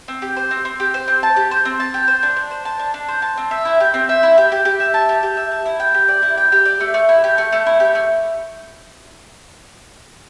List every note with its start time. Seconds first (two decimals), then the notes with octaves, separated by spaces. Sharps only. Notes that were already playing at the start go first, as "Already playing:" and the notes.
0.08 C4
0.22 G4
0.36 C5
0.51 C4
0.65 C4
0.80 G4
0.94 C5
1.08 C4
1.23 A5
1.36 G4
1.51 C5
1.65 C4
1.80 A5
1.94 G4
2.08 C5
2.23 D4
2.37 D4
2.51 C5
2.65 A5
2.79 D4
2.94 D4
3.08 C5
3.22 A5
3.38 C4
3.51 E5
3.65 E4
3.80 G4
3.94 C4
4.09 E5
4.23 E4
4.38 G4
4.52 G4
4.65 G4
4.80 E5
4.94 A5
5.09 G4
5.23 G4
5.37 E5
5.52 A5
5.66 E4
5.80 G5
5.94 G4
6.09 D5
6.22 E4
6.37 G5
6.52 G4
6.65 D5
6.80 A3
6.94 A3
7.09 E4
7.24 G4
7.38 A3
7.52 A3
7.66 E4
7.80 G4
7.95 A3